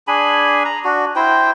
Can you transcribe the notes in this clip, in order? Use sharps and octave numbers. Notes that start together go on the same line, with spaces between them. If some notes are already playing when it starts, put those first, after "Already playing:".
D4 G#4 G#5 B5
A#5
D4 F#4
E4 C5 G5